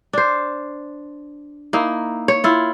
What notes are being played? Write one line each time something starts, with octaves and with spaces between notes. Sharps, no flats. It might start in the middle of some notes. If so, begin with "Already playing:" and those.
D4 C5
A#3 D#4 E4
C#5
E4 F4